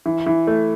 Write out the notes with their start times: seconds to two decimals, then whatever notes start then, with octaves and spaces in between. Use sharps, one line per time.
0.06 E3
0.27 E3
0.47 A3